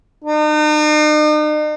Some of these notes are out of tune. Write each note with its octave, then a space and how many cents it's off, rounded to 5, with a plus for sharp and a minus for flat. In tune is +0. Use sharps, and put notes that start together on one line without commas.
D#4 -45